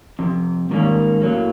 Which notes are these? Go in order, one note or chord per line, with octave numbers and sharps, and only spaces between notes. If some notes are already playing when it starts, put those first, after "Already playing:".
F2 C3
G#2 D#3 G3 A#3 C#4
A2 F#3 A#3